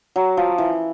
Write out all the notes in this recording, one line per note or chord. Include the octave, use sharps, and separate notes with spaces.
F#3
F3
E3